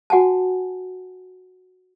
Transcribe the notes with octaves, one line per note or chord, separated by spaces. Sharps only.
F#4 F#5 G#5 A5